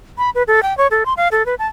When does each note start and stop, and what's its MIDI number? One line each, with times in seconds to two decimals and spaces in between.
0.18 0.30 83
0.35 0.43 71
0.48 0.63 69
0.63 0.76 79
0.78 0.87 73
0.91 1.04 69
1.06 1.13 84
1.17 1.28 77
1.32 1.45 69
1.46 1.55 71
1.59 1.67 81